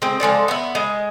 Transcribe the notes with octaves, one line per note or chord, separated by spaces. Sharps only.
G#3 C4
F3 G#3 A4 D5
B3 E4
G#3